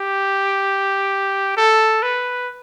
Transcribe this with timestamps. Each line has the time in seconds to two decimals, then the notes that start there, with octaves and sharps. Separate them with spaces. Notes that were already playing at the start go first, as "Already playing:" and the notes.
Already playing: G4
1.57 A4
2.02 B4